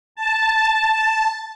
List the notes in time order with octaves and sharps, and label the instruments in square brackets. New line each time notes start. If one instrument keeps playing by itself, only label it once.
[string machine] A5